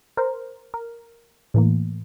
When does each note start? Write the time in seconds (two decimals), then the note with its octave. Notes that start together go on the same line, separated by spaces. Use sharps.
0.17 A#4 C5
0.74 A#4
1.54 A2 E3 A#3